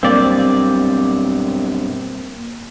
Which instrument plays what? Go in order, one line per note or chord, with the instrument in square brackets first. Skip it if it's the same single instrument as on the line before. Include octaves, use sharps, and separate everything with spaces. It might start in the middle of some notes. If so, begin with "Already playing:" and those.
[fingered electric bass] B1 G2 [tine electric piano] A#3 [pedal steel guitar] C4 D5